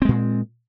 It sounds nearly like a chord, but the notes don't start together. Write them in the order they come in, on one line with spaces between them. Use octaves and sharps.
C4 G#3 A#2